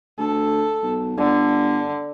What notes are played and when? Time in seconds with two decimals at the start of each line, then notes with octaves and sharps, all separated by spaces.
0.19 D2 A4
0.83 B1
1.17 G1 D3